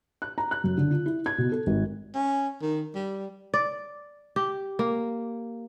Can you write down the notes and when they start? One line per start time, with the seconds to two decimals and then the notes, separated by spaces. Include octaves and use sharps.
0.22 F#6
0.38 A#5
0.51 F#6
0.64 F#2
0.78 D3
0.91 F4
1.06 E4
1.26 G#6
1.38 B2
1.52 A4
1.67 G#1
2.14 C#4
2.61 D#3
2.95 G3
3.54 D5
4.36 G4
4.79 A#3